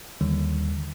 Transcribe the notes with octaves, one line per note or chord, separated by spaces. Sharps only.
D#2 D3 D#3 G3